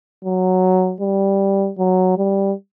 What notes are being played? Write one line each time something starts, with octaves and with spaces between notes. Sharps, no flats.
F#3
G3
F#3
G3